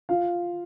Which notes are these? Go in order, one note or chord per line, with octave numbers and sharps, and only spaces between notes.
F4 F5